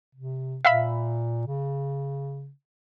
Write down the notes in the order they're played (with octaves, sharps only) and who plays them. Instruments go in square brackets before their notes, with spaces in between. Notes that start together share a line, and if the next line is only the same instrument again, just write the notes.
[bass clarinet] C3
[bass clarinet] A#2 [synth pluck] E5 F5 B5
[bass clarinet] C#3